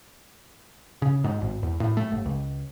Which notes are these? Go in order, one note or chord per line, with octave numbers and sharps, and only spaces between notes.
C#3
G#2
G#1
E2
A2
A3
G1
C#2